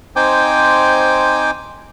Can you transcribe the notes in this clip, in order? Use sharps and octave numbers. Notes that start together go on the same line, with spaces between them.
C4 D#4 C5 G5 G#5 D6